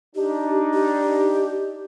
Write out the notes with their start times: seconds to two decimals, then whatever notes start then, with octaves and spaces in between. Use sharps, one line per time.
0.16 D4 D#4 G4
0.74 G4